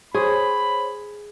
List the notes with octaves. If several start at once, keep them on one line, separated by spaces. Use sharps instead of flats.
G#4 C5 C#5 B5